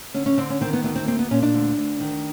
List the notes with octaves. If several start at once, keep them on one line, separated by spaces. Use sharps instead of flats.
D3 C#4
C#4
D3 C4
C#4
D#3 C4
B3
D2 B3
C4
A#3 C4
B3
A#2 C#4
D4
D2
D2
D#3